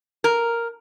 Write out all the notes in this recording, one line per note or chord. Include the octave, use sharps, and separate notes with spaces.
A#4